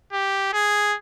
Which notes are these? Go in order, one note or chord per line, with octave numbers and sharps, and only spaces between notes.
G4
G#4